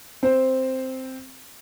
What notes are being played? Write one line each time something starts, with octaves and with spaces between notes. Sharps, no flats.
C4 C5